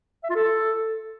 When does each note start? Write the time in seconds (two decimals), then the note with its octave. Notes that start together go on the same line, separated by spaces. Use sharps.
0.24 E5
0.30 F4
0.36 A4